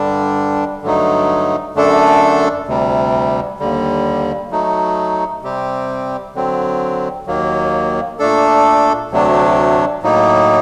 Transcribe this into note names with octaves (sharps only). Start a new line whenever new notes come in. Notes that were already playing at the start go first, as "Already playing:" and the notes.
Already playing: G2 D3 G3 D4
G2 D3 F#3 A3 D#4
F#2 D3 A3 D4 A4
D2 C3 G3
D#2 D3 G3
F#3 A3 D#4
C3 G3 C4 G4
D3 F#3 C4
D#2 D#3 F#3 A#3
A#2 A3 D4 A4
D2 C3 F#3 A3 D4
A2 F#3 A#3 D#4